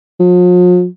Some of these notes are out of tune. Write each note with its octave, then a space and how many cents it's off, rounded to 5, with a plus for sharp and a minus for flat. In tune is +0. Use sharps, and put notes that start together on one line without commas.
F3 +45